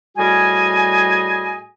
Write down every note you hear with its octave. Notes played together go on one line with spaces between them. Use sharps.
A2 G3 F#4 G#4 D#5 G#5